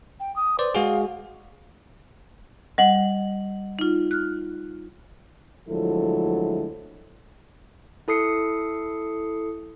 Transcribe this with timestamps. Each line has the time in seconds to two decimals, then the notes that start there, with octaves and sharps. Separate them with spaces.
0.20 G5
0.36 D#6
0.59 B4 C5 D5
0.75 G#3 F#4 G#4 F5
2.78 G3 D#5 F#5 F#7
3.79 D#4 F4
4.11 F6 F#6
5.69 D2 F3 F#3 G#3 E4 A4
8.08 E4 A4 D#6 C7 C#7